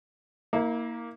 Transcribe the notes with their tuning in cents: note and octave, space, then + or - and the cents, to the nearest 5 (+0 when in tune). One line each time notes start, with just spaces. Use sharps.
A#3 +0 E4 -40